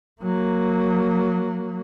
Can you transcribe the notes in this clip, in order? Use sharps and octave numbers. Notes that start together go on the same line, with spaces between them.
F#3 A#3